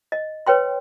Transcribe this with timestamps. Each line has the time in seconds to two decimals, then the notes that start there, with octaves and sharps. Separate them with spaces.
0.12 D#5
0.47 B4 C#5 G5 C6